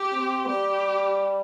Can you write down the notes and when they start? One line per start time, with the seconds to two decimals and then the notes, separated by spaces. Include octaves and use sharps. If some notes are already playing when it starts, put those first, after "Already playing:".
Already playing: G4
0.12 C4
0.47 G3 G4